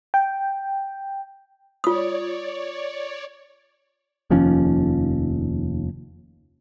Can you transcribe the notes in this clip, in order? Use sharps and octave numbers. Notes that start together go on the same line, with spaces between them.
G5
F4 C#5 D5 D#6
F1 D#2 F3 C#4